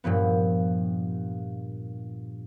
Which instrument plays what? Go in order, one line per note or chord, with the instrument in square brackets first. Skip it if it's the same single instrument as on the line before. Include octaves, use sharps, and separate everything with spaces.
[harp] G2 A#2 F3 B3